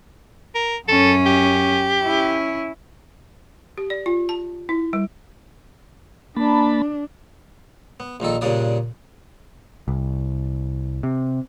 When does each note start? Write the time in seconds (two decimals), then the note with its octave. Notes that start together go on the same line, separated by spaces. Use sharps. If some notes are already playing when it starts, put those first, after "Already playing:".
0.55 A#4
0.88 F#2 C#4 A4
1.26 G4
2.00 C#4 E4
3.78 G4
3.90 D5
4.06 F4
4.29 A5
4.69 E4
4.93 G3
6.36 A#3 D4 A5 B5
8.00 B3
8.20 A#1 A#2 D#3 A4
8.41 G2 A#2 C#3 D4 D5 D#6
9.88 C2
11.03 C3